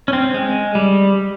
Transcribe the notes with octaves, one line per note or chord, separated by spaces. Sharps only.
C#4
C4
G#3
G3